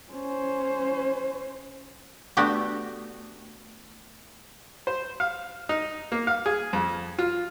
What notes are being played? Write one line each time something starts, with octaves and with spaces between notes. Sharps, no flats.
C#4 C5
A3 B3 D4 F#4 G4
C5
F5
D#4
A#3
F5
G#4
F2
F4